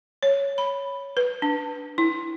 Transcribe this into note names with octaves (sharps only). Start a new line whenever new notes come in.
C#5
B5
B4
D4
E4